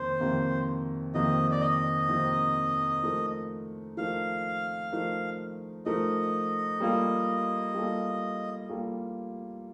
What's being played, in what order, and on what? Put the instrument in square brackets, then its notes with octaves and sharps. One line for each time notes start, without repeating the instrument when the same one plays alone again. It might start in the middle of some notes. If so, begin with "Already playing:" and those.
Already playing: [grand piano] F2 C3 D#3 A#3 [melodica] C5
[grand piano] F2 C3 D#3 A#3
[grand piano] F2 C3 D#3 A#3 [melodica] D#5
[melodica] D5
D#5
[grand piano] F2 C3 D#3 A#3
F3 A3 D#4 A#4
[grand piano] F3 A3 D#4 A#4 [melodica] F5
[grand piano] F3 A3 D#4 A#4
[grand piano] F3 A3 D#4 A#4 [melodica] D#5
[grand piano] G3 A#3 F4 A4
G3 A#3 F4 A4
G3 A#3 F4 A4